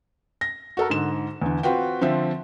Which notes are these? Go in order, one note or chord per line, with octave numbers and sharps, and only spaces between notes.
A#6
F#4 A4 A#4
G#2 D3 E7
E2 D3
C4 F4 F#4 B4 G5
D3 F3 C4 E5